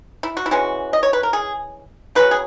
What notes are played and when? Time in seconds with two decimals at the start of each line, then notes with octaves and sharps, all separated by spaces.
0.23 E4
0.37 F#4
0.46 E4
0.51 E3 G#3 C#4 F#4
0.93 D#5
1.03 C#5
1.13 B4
1.23 A#4
1.33 G#4
2.15 C#3 F#3 C#4 B4
2.31 G#4